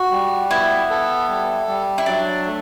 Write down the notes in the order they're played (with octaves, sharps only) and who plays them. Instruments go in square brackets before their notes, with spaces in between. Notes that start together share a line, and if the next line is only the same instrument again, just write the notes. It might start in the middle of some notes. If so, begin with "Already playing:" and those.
Already playing: [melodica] F#4
G3
[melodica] B3 [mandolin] E4
[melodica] A4
G3
G3
[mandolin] E4
[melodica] F#3 [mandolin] D4
[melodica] A3